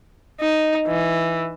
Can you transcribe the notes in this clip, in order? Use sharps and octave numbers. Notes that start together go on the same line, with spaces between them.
D#4
E3